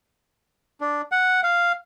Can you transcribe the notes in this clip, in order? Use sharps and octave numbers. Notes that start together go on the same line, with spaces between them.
D4
F#5
F5